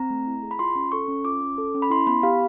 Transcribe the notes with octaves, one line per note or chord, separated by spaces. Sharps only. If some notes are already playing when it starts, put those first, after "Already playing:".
Already playing: C4 A#5
A3
E4
G#4
B5
F4 C6
C#4
A4 C#6
C#4
F4 D6
C#4
A4
C#4
B5
E4 C6
B3 B5
G4 F5